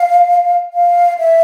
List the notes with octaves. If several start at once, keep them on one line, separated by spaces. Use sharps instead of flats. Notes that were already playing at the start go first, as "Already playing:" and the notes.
Already playing: F5
F5
E5